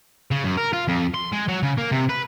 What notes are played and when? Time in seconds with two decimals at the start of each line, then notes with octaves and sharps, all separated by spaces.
0.31 C#3
0.44 F#2
0.57 A#4
0.73 F4
0.88 F2
1.14 C6
1.32 G#3
1.48 F#3
1.63 C#3
1.78 A#3
1.92 C3
2.09 B4